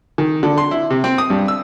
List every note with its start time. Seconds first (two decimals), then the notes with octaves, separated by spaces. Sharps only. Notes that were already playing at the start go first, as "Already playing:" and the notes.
0.18 D#3
0.43 D3
0.58 C6
0.71 E4
0.90 C3
1.04 C4
1.18 D#6
1.30 G2
1.48 E6